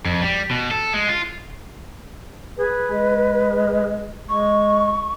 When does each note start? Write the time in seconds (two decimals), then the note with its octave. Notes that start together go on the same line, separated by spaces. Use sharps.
0.05 F2
0.22 G3
0.51 B2
0.71 A4
0.94 G#3
1.09 F4
2.57 G#4 B4
2.91 G#3
4.29 G#3 C#6